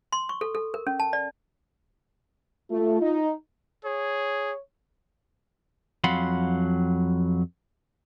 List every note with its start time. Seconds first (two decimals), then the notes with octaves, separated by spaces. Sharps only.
0.12 C6
0.29 C#6
0.41 A4
0.55 A4
0.74 A#4
0.87 C#4
1.00 A5
1.13 D5
2.71 A3 F4
3.01 D#4
3.85 G#4 C#5
6.04 F2 F#3 F5 F#5 B5 C6